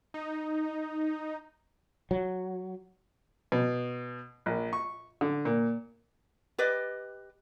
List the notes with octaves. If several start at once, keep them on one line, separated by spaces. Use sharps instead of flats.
D#4
F#3
B2
A#1
C#6
D3
A#2
G4 B4 D5 D#5